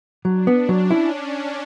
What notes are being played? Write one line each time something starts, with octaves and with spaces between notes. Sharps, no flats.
F#3 D4
B3
F#3 C#4
E4